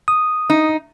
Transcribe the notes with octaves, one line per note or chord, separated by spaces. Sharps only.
D#6
D#4